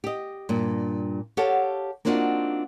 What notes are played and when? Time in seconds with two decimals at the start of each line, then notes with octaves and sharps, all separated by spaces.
0.04 G4 D#5
0.49 G2 A#2
1.37 G4 A4 C#5 F5 F#5 A5
2.05 A#3 C4 D4 D#4 F4 F#4